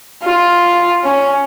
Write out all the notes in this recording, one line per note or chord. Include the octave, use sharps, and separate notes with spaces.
F4
C#4